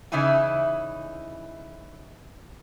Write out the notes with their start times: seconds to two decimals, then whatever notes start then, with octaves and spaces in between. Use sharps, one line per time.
0.12 C#3 E3 D#4 E4 G#5